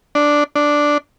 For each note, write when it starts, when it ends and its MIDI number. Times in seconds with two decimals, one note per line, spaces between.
0.15 0.44 62
0.56 0.98 62